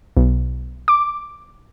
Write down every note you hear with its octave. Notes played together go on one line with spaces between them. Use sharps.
B1
D6